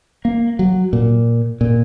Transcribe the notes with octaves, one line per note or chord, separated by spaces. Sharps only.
A#3
F#3
A#2
A#2